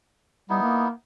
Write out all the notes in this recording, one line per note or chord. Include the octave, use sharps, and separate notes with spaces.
G3 B3 D#4 E4
A#3